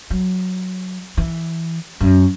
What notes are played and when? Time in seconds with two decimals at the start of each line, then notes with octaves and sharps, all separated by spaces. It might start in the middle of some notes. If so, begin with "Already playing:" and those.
0.10 F#3
1.17 E3
2.00 F#2